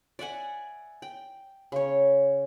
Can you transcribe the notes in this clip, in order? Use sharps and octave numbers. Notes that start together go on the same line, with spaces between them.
D5 E5 F#5 G#5
G5
C#3 C#5